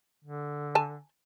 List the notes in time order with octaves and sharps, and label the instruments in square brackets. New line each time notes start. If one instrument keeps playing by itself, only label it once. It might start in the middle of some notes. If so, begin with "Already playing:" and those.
[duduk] D3
[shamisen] G#5 A5